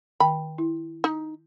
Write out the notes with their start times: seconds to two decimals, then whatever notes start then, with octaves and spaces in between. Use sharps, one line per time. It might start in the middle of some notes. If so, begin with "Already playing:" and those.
0.20 D#3 G5 A5 B5
0.58 E4
1.04 D#4